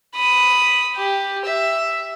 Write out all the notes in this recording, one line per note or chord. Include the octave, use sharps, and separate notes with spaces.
B5 D#6
G4
E5